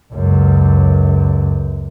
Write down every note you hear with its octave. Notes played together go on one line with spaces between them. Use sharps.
C#2 F#2